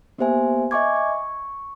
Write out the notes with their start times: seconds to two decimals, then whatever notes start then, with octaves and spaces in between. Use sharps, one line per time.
0.18 A#3 B3 G4 C5 E5 G#5
0.71 D#5 E5 G#5 C#6 D6 G#6
0.96 C#6